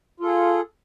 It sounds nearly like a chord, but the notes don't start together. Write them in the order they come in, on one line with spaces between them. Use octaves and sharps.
F4 A4 G#4